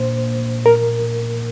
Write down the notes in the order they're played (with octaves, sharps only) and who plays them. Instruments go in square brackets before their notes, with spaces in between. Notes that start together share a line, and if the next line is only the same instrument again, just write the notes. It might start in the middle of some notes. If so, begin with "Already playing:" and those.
Already playing: [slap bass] A#2 A#3 D4 [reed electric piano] C5
[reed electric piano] A#4